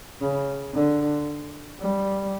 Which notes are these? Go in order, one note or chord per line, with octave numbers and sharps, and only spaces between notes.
C#3
D3
G3